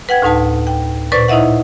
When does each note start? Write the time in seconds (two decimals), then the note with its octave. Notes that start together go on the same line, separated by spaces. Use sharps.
0.09 B4 F#5 G5 G#6
0.22 D2 A2 D#4 B4 A5
0.67 G5
1.12 A#2 B4 C5 D5 C#6 A6
1.28 D#4 E4 D#5 E5 F#5